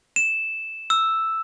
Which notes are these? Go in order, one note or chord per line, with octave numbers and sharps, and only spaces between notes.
E7
E6